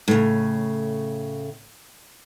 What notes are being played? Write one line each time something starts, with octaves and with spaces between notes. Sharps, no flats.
A2 C#3